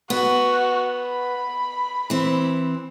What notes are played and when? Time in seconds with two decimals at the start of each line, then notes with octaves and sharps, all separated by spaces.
0.10 B3 F#4
1.01 B5
2.10 E3 C4